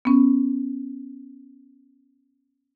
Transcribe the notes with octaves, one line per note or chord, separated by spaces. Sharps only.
B3 C#4